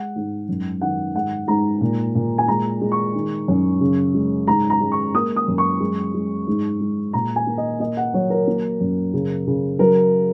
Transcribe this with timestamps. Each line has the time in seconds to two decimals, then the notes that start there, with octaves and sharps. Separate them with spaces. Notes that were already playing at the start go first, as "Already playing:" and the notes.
Already playing: G#3 F#5
0.16 G#2
0.49 F#2
0.81 D#3 F#5
1.15 G#2 F#5
1.47 G#2 A#5
1.81 A#2
2.15 A#2
2.38 G#5
2.48 G#3 A#5
2.81 G#3
2.92 C#6
3.15 D#3
3.48 F#2
3.81 C#3
4.14 G#3
4.48 G#2 A#5
4.70 A#5
4.81 G#3
4.92 C#6
5.15 A#3 D#6
5.36 D#6
5.48 F#2
5.58 C#6
5.80 G#3
6.14 G#3
6.47 G#2
6.80 G#3
7.13 A#2 A#5
7.36 G#5
7.47 A#3
7.58 D#5
7.80 A#3 D#5
7.97 F#5
8.14 F#3 C#5
8.30 A#4
8.47 A#3
8.81 F#2
9.14 C#3
9.47 C#3
9.79 F#3 A#4